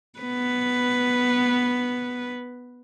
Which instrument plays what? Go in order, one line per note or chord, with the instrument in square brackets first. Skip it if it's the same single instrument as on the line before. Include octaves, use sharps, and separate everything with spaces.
[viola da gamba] B3 B4